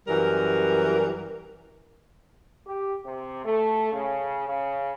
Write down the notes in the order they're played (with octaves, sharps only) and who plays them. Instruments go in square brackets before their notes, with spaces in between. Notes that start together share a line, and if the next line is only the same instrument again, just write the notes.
[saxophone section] F#2 E3 G3 A#4
[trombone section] G4
C3
A3
C#3
C#3